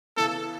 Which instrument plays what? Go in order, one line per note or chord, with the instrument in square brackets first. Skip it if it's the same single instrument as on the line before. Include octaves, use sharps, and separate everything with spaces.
[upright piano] C#3 E3 B3 E4 [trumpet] A4